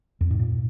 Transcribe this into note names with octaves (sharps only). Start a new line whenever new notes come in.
F2
G#2
A#2